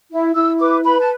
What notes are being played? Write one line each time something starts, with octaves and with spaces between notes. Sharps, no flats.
E4
E4 E6
B4 D6
B4 B5
A5